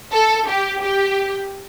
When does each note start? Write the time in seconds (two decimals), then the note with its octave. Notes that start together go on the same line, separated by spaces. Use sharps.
0.12 A4
0.47 G4
0.81 G4